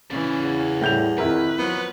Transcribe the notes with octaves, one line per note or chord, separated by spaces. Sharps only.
C#3 E3 C#4 D5
E2
A2 G3 G6 F7
F2 D#3 E4 A#4 B4
F3 F#3 B3